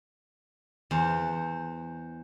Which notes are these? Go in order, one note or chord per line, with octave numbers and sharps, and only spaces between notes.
E2 C5